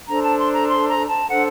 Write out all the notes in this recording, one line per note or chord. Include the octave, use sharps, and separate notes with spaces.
D4 A4 C5 A#5
A5
C6
A#5
C6
A#5
A5
D4 A4 C5 F#5